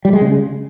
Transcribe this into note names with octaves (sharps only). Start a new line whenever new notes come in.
G3
G#3
C#3